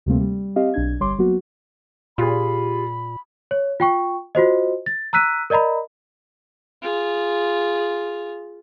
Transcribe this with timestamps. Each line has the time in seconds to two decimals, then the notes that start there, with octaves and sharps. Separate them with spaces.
0.06 D2 C3 G3 A3 A#3 C4
0.20 G3
0.56 C4 G4 D#5 F5
0.74 B1 D4 G#6
1.00 G1 G3 C#5 C6 D6
1.19 F#3 A#3 B3 F#4
2.18 A#2 F4 G4 G#4 B5
3.51 C#5
3.80 F4 G5 C#6
4.35 F4 F#4 C5 D#5
4.86 A6
5.13 A#5 E6 F#6 B6 D#7
5.50 A#4 D5 D#5 A#5 B5
6.82 F4 G#4